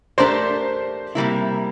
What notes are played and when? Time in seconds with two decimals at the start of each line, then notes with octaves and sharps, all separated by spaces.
0.18 A3 D4 G4 A#4 C5 D5
1.15 C3 G3 A#3 E4